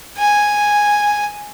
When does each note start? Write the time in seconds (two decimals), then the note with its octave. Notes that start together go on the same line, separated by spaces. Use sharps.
0.18 G#5